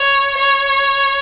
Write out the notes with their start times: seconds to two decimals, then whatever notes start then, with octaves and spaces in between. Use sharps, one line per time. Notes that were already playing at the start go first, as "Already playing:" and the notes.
Already playing: C#5
0.37 C#5